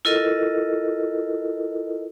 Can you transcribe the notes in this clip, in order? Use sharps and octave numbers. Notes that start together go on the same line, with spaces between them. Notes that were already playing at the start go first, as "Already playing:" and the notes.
E4 F4 A4 A#4 D#5